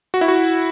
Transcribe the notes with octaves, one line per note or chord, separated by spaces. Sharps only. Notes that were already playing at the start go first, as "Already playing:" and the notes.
F#4
E4
F#4